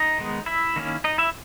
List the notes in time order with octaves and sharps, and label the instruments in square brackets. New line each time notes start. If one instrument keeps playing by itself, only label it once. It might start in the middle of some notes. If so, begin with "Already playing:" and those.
Already playing: [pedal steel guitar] D#4 D#5
D#3 G#3 B3
E4 E5
D#3 A#3 C#4
D#4 D#5
E4 E5